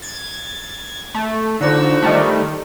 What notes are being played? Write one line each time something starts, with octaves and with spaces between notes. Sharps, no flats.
G#6 A6
A3
D3 F3 D#4 F#4 E6
D#3 G3 A3